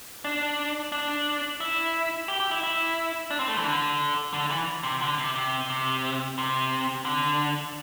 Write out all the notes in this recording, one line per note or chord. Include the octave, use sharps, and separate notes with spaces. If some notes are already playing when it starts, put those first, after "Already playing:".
D4
D4
E4
G4
G4
E4
E4
D4
C4
A3
E3
D3
D3
E3
C3
D3
C3
C3
C3
C3
D3